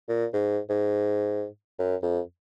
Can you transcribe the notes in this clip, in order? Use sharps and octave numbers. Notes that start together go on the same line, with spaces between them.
A#2
G#2
G#2
F#2
F2